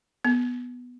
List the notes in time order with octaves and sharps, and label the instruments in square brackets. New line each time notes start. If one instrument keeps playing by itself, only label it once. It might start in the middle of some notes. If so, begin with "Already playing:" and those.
[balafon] B3